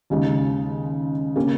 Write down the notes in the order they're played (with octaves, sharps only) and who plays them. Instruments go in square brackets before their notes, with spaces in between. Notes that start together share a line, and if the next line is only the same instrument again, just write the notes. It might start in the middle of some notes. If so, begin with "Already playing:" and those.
[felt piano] D#2 C#3 G#3 D#4
C#3 A#3 C#4